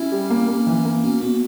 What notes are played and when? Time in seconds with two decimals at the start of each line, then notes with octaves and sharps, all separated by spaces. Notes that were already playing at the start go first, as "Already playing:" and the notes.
Already playing: C#4 E4
0.12 G3
0.30 A#3
0.48 A#3
0.67 E3
0.85 A#3
1.04 B2 C#4
1.21 B2 A#3